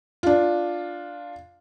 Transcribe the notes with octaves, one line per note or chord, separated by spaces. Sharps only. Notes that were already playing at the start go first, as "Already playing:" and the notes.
D4 F4